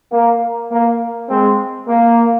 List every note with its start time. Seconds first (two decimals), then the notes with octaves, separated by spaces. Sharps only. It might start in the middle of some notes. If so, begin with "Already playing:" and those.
0.12 A#3
0.71 A#3
1.29 G#3 C4
1.89 A#3